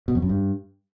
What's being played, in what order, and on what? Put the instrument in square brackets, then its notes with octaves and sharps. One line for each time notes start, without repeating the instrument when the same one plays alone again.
[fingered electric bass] B2
F2
F#2
G2